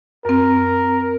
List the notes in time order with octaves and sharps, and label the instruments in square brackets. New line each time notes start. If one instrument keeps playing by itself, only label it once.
[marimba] F#2 C4 [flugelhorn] A#4